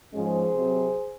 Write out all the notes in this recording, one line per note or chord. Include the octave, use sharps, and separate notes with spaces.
G#2 F3 G#3 C#4 G#4 C5
C3 F#3 C4